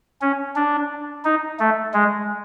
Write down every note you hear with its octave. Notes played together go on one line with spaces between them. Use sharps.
C#4
D4
D#4
A3
G#3